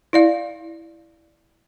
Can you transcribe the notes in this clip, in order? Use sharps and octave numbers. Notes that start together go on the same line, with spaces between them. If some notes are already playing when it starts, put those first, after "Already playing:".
E4 D5 F5